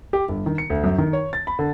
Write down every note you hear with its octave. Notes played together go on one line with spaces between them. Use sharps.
G4
G1
D#3
C#7
D2
F#2
D#3
C#5
A6
B5
D3